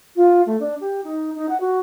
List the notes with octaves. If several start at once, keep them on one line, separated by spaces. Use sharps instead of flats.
F4
A3
D4
G4
D#4
D#4
F#5
F#4